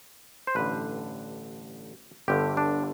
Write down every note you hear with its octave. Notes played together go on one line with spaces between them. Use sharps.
C5
A1 G2 D3 B4
G1 G2 D3 G4
D4